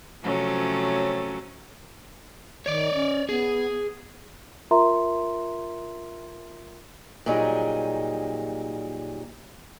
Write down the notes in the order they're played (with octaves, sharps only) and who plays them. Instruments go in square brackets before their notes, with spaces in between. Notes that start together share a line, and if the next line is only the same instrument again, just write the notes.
[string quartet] C3 F3 F#3 A3 C#4
[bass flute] D#3 [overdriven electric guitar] C#5 D5
[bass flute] C#4
[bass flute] B3 [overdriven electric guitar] G#4
[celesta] F4 A#4 E5 A#5 C6
[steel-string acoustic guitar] A#2 F#3 G3 D#4 G#4